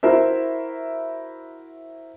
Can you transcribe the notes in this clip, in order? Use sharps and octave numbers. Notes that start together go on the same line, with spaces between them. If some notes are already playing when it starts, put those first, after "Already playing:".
E4 F#4 A#4 C5 E5